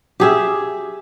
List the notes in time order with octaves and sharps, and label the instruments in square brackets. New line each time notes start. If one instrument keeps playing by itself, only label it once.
[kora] G4 G#4 E5